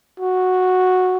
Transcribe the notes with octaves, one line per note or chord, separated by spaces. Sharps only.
F#4